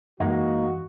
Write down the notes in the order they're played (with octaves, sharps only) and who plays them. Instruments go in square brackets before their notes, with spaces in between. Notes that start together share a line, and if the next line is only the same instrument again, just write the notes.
[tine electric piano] F#2 E3 [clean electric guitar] G#3 A#3 D#4 [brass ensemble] F#4